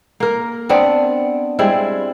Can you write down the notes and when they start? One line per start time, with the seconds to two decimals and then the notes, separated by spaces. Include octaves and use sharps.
0.20 A#3 A#4
0.69 B3 C4 D4
1.59 G3 G#3 C4 E4